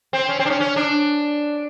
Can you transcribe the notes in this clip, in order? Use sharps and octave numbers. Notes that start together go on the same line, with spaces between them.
C4
C#4
C4
D4
C#4
C#4
D4